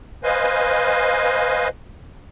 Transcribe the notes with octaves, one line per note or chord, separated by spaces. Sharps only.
B4 C5 D#5 F5 G#5